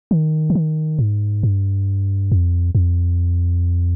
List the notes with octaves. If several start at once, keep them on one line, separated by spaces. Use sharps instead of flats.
D#3
D3
D#3
G#2
G2
F2
F2